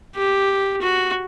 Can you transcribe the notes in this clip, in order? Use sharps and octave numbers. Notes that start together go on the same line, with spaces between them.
G4
F#4